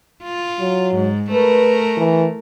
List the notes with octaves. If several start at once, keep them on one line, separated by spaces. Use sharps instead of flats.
F4
F#3
G#2
A3 A#4 B4
E3